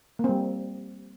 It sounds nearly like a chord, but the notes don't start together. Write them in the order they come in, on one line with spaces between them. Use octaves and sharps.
A#3 C4 G3